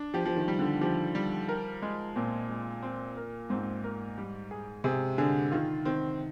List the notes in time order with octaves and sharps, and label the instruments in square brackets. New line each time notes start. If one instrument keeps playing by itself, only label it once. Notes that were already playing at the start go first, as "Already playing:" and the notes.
Already playing: [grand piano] D4
[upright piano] F3 [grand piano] G4
[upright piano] F3
D#3
[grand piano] G3
[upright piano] D3
[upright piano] F3 [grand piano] G4
[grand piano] G3
A#4
G#3
[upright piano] A#2 [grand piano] C4
[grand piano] G#3
C4
A#4
[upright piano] G#2 [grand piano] C4
[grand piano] A#4
G3
G#4
[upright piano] C3 [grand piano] G#4
[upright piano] D3 [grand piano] G#4
[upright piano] D#3 [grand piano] F4
[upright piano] D#3 [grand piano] C4